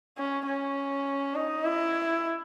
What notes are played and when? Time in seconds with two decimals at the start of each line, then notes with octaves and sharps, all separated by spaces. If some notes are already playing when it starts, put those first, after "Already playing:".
0.18 C#4
0.47 C#4
1.35 D#4
1.65 E4